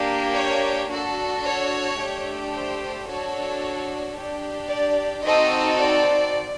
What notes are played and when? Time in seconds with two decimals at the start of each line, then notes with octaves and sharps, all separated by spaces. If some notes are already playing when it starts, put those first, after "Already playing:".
Already playing: A#3 D4 G4
0.34 C#5
0.90 D4 F#4 A4
1.44 C#5
1.99 A3 D4 G4
2.53 C5
3.07 D4 F#4 A4 C#5
4.16 D4 G4
4.70 D5
5.24 C4 D#4 F#4 A4 D#5
5.78 D5